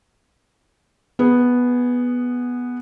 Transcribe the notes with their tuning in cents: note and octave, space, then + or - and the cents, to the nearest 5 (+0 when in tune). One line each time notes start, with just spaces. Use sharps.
B3 -5 G#4 -5